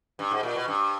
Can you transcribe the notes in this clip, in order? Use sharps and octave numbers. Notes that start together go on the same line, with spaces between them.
G2
G#2
A#2
B2
G2